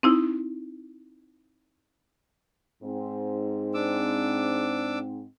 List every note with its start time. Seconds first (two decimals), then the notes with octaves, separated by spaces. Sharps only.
0.03 C4 D#4 E4
2.84 G#2 C4
3.74 D4 D6 E6